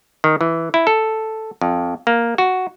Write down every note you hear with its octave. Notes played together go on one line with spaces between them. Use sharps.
D#3
E3
E4
A4
F2
A#3
F#4